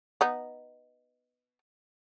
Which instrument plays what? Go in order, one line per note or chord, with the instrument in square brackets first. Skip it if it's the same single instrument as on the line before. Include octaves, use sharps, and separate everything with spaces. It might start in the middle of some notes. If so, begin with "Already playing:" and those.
[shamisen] B3 D#4